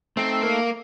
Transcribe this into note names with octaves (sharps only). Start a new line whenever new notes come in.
A3 C4 D#4 A4
A#3